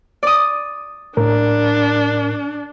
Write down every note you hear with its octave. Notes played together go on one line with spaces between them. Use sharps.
D5 D#6
A2 D4 A#4